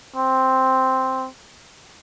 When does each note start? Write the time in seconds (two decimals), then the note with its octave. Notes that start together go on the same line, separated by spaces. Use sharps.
0.16 C4